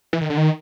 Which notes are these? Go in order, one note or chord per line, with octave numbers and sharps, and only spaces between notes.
E3
D#3
D3
D#3